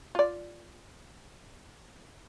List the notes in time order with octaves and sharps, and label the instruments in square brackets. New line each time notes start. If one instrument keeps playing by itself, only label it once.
[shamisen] F4 D5